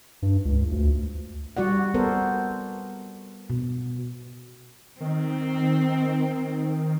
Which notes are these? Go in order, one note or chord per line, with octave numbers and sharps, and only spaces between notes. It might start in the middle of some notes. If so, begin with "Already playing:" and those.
G2
C#2
D2
G3 F#4 D5 F#5
B3 A4 A#4 C5
B2
D#3 C4